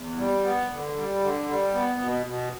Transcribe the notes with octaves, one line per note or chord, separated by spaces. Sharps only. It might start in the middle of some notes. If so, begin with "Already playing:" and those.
Already playing: E2
G3
B3
D3
G3
D3
G3
B3
B2
B2